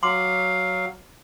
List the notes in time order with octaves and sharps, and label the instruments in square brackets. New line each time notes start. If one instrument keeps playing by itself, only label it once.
[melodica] F#3 F5 [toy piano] C6 D6